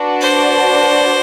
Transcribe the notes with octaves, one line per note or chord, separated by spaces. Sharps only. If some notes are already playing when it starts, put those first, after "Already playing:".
Already playing: D4 F#4 B4 D5
C5